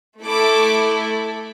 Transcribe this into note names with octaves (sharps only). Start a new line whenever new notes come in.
A3 E4 A4 D6